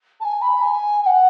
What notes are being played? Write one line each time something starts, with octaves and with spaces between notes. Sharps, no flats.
A5
G#5
B5
G#5
G#5
F#5